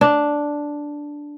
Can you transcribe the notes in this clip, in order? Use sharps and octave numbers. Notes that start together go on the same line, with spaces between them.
D4